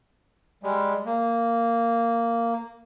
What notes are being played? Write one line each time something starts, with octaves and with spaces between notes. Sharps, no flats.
G3 G#3
A#3